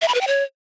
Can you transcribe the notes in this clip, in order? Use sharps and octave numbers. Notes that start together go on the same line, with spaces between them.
E5
B5
B4
G5
C#5